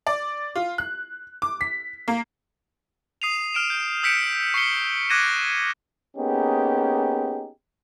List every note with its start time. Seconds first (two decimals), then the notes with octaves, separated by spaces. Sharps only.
0.07 D5
0.56 F4
0.78 F#6
1.42 D6
1.61 B6
2.08 A#3
3.22 D#6 C7 D#7 F7
3.54 F6 D7 E7
3.70 G6
4.03 E6 G6 B6 C#7 D7 E7
4.54 C#6 C7 C#7 G7
5.09 D6 F#6 G#6 A#6 D#7 E7
6.17 A#3 B3 C#4 D#4 G4 G#4